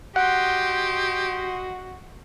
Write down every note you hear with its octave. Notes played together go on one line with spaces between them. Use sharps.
F#4 G4 D#5 F#5 C6